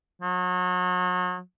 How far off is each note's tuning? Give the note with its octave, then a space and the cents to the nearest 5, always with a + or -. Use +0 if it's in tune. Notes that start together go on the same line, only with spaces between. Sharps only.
F#3 -35